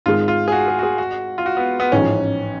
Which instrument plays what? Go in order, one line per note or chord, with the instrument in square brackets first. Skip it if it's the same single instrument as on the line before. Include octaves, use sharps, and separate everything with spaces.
[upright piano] G#1 G#2 G#3 [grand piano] F4
[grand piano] F4
G#4
F#4
G#4
F#4
G#4
F#4
F4
F#4
B3
B3
[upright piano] A1 G#2 F3 [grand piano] C#4